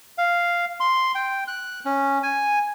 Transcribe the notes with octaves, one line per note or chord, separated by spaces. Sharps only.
F5
C6
G5
F#6
C#4
G#5